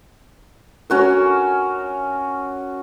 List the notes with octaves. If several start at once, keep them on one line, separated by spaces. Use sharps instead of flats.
C#4 F#4 A#4